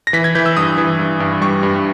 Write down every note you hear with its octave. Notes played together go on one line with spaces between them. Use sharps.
A#6
E3 B6
G#6
E3 G6
E6
G2 D#6
E3
G2
G2
G3 C#6
G2